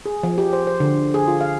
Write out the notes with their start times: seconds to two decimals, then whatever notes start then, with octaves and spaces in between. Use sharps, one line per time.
0.06 G#4
0.23 F3
0.38 G4
0.53 C5
0.67 C5
0.80 D3
1.14 G#4
1.28 F4
1.41 F5